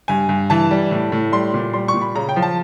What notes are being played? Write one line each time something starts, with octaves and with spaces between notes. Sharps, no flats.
G2 G#5
G2
E3 A5
G3
A2
A2
G3 C6
A#2
G3 C6
C#6
A#2
B5
C#3 A#5
G5
F3
A5